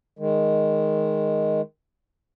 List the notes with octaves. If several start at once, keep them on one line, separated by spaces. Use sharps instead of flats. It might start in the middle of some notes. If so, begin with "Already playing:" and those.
D#3 G#3